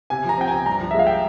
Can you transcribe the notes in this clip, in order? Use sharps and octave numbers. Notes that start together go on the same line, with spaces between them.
C3 G#5
F3 A#5
C4 G5
C3 G#5
G2 A#5
F3
E5
G#3 F5
G5